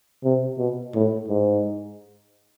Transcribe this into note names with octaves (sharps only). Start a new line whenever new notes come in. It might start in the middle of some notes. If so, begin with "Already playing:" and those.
C3
B2
A2
G#2